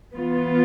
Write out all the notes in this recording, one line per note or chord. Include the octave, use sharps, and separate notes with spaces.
E3 B3 F4